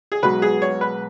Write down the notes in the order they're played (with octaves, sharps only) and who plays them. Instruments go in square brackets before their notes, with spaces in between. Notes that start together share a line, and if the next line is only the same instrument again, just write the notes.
[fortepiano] G#4
[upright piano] B1 B2 G#3 B3 F#4 [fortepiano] B4
[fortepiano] G#4
C#5
B4